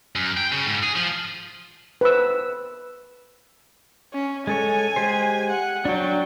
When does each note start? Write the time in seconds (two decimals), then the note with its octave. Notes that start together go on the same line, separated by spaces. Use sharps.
0.16 F#2
0.37 G5
0.52 C#3
0.66 G#2
0.83 G#4
0.96 F3
2.01 B4 C5 E6
4.13 C#4
4.47 G#3 A4 C#5 G#5
4.96 G#3 G4 C5
5.50 F#5
5.85 F#3 D4 G5